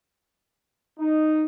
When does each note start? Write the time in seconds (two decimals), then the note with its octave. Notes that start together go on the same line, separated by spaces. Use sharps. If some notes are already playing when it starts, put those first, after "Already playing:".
0.99 D#4